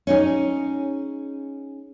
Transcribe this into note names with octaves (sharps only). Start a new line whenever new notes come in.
C#4 D#4 G#4